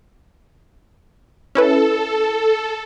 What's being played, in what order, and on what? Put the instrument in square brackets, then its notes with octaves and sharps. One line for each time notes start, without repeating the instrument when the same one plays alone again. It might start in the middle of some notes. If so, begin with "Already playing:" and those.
[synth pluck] C#4 E4 B4 [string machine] A4